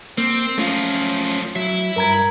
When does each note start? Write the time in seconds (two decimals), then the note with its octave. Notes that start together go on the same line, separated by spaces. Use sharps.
0.18 A#3 C4
0.58 F#2 F3 A3 C#4 F4
1.56 F#3 E4 E5
1.96 G2 A#4 A#5 G#6